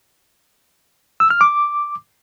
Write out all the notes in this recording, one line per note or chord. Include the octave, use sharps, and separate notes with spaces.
E6
F6
D6